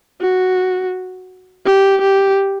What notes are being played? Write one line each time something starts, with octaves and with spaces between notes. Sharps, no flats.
F#4
G4
G4